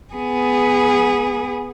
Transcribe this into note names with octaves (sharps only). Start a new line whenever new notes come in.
B3 G#4